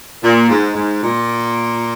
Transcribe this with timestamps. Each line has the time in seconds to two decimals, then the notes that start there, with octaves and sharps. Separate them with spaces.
0.23 A#2
0.49 G#2
0.75 G#2
1.03 A#2